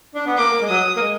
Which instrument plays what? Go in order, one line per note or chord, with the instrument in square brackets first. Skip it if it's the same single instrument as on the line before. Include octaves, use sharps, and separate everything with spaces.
[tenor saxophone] D4
B3
[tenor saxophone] A#3 [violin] D6
[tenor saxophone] A#3
G#3
[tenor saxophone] F#3 [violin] D#6
[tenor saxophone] A#3
G#3